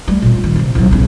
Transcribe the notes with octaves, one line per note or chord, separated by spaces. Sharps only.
G3 A3
A#2 C4
D#3
C3 C4
C2 F#3
B1 C#3